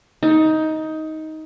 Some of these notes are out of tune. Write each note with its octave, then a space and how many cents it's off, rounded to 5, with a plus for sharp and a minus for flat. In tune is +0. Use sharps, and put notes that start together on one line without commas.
D#4 +15